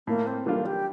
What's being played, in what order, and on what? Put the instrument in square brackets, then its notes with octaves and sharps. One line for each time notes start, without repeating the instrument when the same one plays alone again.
[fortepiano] A2 [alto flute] A#3
[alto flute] C4
[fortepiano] E3 G3 D4 F4 [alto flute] A#3
[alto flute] G4